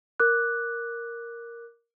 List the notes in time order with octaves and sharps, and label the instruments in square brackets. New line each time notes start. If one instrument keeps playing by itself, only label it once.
[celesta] A#4 D6 F#6